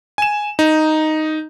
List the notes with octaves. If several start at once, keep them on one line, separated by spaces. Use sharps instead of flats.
G#5 E7
D#4